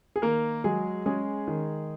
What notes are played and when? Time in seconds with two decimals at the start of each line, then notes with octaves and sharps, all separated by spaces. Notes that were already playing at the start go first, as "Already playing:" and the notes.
0.16 G#4
0.22 D#3 A#3 A#4
0.64 F#3 G#3 G#4
1.06 G#3 C#4 G#4
1.48 D#3